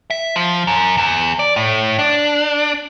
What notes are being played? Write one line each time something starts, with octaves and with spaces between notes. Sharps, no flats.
E5
F3
F#2
E2
D5
A2
D4